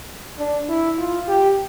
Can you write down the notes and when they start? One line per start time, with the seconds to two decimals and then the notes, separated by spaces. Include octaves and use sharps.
0.39 D4
0.69 E4
0.98 F4
1.28 G4